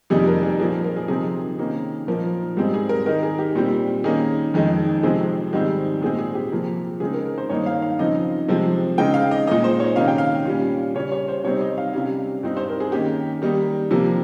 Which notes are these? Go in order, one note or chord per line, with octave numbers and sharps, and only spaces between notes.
F2 C3 G3 A#3 D#4 G#4
A#4
G#4
A#2 F3 A#3 G#4
A#4
G#4
C3 F3 C4 D#4 G#4
C3 D#3 A#3 C#4
A#2 F3 A#3 D#4 A#4
G#2 G3 C4 D#4 G#4
G#4
A#4
D#3 G#3 D#4 A#4
G#4
G4
A#2 G3 C4
D#3 A#3 C#4 G#4
F2 D#3 G#3
C3 F3 G#3 C4 G#4
G#2 D#3 G3 C4
A#2 G#3 C4 G#4
G#4
G4
C3 F3 A#3
C#3 G#3 C4 D#4 G#4
A#4
A#4
C5
G2 D#3 A#3 D#4 C#5
F5
F5
C#3 F3 C4 D#4 D#5
C3 F3 G#3 C4
C#3 G#3 C4 D#4 G5
F5
D#5
A#2 G#3 D#4 D#5
C5
C#5
C3 D#3 A#3 C#4 F5
G5
F5
A#2 G3 C#4
C#3 G3 C#4 C#5
C#5
C5
C3 G3 C4 D#4 C#5
D#5
F5
C3 G3 C#4 F5
G2 G3 C4 D#4
C5
A#4
G#4
D#3 A#3 C#4 G4
D#3 G3 A#3 D#4
C3 F3 A#3